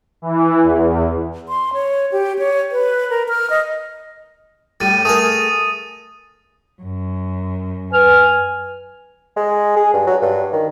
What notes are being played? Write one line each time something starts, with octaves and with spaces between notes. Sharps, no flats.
E3
E2
C6
C#5
G4
C#5
B4
A#4
F6
D#5
A2 G3 A6 D#7
A3 G#4 A#4 D#6
F#2
B4 G#5 F6
G#3
G#4
G2
F#3
G2
D#3